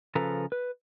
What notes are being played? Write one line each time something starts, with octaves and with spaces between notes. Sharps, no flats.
C#3 F3 A4 B4 A#5
B4